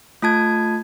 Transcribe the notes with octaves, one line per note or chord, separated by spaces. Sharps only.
A3 F4 A5 G#6